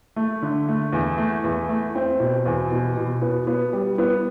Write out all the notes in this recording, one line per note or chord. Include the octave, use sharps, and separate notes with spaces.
A3
D3
A3
E2
A3
E2
A3
C4
B2
E2
B2
B2
B3
B3
G3
B3